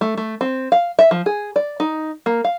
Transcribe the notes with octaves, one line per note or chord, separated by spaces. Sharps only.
A3
A3
C4
F5
E5
F3
G#4
D5
D#4
A#3
F5